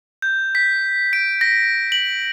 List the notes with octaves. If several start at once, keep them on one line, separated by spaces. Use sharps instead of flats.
G6
B6
D7
A#6
F#7